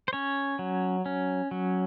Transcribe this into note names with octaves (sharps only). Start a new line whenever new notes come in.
C5
C#4 C#5
F#3
C#4
F#3